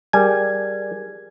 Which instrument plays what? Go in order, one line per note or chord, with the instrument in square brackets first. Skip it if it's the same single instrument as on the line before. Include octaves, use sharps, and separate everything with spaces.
[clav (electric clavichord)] G3 G#5 [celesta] G#4 A#4 G#6